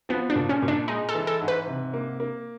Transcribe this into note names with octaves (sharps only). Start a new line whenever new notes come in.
F3 B3
D4
A#2
C#4
A#2
D4
G#3 D#4
A4
E3
A4
G#2
B4
C3
A#3
A#3